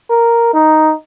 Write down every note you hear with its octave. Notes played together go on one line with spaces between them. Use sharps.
A#4
D#4